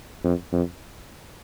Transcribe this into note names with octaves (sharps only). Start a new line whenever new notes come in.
F2
F2